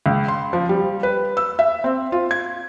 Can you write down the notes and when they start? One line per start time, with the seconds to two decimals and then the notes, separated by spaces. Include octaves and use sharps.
0.06 C#2
0.28 C6
0.53 F3
0.69 G3
1.03 B4
1.37 E6
1.59 E5
1.84 C4
2.12 F4
2.31 G#6